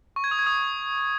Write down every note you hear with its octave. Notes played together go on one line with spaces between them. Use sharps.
C#6
G#6
D#6
G#6
D#6